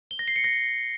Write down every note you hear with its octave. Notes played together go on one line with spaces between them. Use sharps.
G7
A#6
C7
C#7
A#6